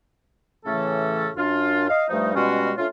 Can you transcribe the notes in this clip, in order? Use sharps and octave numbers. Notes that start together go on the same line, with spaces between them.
A2 C#3 E3 A3 C#4 A4
F#2 D4 F4
D#5 F5
G2 F3 G3 A3 D#4
B2 G3 G#3 C#4 F4 F#4
A3 C#4 D4 F4